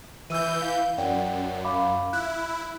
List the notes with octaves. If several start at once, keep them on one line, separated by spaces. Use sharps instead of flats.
E3 E5 E6 G6 D#7
F5
F#2 D5 F#5 G5
F5 B5 D6
E4 F#6